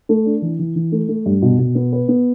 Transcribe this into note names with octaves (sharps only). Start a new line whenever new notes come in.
A3
D4
E3
E3
E3
A3
A3
G2
B2
B2
B3
B4
B3